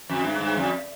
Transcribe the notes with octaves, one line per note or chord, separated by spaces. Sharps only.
F2
G2
G2
F2